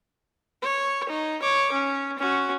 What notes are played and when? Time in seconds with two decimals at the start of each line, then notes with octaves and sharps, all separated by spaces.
0.62 C#5
1.09 D#4
1.43 C#5 D6
1.72 C#4
2.18 C#4 F#4